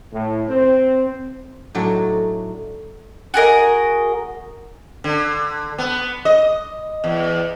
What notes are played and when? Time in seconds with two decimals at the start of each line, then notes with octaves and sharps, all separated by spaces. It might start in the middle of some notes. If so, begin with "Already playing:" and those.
0.13 A2
0.48 C4
1.75 A2 F#3 D4 D#4
3.34 F#4 G#4 A#4 D#5
5.04 D3
5.78 B3
6.25 D#5
7.04 E2